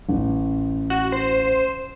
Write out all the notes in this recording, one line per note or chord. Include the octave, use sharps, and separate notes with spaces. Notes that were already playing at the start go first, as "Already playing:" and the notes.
A1
F#4
C5